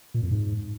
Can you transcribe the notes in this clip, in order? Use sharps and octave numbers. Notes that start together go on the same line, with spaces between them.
A#2
F2
G#2